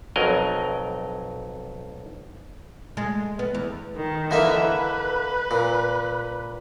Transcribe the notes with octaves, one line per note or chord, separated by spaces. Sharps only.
B1 F2 F#3 A#4 D#5
G#3
B3
E2
D#3
D3 E3 A#3 D#5 E5
B4
A#2